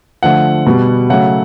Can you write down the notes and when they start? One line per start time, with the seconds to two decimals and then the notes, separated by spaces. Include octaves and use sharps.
0.23 D3 F3 A3 F#5
0.66 B2 G3
1.09 C#3 F#3 A3 F#5